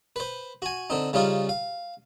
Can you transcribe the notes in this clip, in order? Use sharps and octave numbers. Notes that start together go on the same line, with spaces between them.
B4 C5
F#4 G#5
D3 C4 D#4
C#3 G3 C#4 D#4 F4
F5